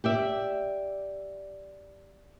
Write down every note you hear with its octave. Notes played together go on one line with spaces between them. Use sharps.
G4 D5 E5